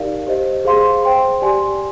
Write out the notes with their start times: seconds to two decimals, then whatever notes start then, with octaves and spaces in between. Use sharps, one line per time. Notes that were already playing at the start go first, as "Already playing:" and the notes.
Already playing: D#4 G4 A#4 D5 F5
0.27 G4 C5 D#5
0.65 G#4 C5 F5 C6
1.03 C5 G5 C6
1.42 G4 D5 G#5 C6